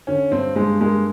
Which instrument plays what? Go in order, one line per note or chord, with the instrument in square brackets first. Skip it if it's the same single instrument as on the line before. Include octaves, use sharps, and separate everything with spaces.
[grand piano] D3 [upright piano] C#4
[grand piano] G2 [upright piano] C4
[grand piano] G2 [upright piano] G#3
[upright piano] G#3 [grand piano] A#3